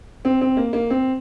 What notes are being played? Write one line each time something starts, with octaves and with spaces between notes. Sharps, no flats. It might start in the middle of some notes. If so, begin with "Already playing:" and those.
C4
C4
A#3
A#3
C4